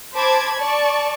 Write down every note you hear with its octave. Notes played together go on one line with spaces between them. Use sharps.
C5 A5 B5 D6 G#6
D5 A5 C#6